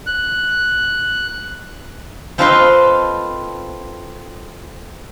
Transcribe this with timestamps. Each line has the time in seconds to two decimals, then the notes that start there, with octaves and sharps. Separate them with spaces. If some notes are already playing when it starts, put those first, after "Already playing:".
0.07 F#6
2.38 C4 F4 A4 B4 D#5 F5